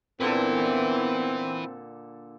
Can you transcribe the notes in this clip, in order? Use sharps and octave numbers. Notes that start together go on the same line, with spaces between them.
A#2 D3 B3 C4 E4 A4 B4